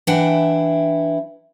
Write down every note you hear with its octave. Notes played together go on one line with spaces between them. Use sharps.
E3 D4 E4 F#5 G5